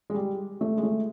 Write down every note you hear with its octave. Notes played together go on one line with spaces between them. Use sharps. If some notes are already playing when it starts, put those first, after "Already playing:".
G#3
G3
A3
G#3
A3